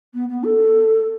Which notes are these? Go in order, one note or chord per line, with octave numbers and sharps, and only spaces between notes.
B3
B3
A4